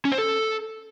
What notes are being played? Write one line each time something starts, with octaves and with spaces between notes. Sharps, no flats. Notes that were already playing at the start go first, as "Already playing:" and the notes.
C#4
C5
A4